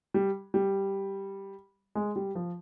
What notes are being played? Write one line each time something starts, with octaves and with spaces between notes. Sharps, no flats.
G3
G3
G#3
G3
F3